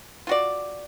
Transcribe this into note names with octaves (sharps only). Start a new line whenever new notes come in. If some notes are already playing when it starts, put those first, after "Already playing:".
F4 F#4 D5